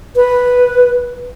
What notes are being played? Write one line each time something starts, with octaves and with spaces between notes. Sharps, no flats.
B4